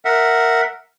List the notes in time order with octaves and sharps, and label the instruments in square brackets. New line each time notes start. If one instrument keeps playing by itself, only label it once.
[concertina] A#4 E5 F#5